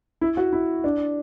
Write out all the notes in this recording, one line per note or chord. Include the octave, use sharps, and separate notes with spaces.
E4
F#4
E4
D4